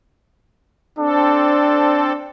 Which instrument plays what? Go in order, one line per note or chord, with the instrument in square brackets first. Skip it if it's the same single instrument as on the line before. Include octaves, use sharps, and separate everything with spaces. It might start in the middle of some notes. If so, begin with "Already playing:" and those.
[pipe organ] C4 A4 [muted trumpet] D4